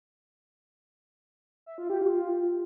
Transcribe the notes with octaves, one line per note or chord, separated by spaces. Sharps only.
E5
F4
G4
F4